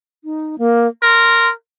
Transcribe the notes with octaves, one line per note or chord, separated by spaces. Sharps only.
D#4
A#3
A#4 C6